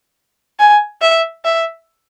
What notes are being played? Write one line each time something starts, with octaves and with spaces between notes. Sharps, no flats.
G#5
E5
E5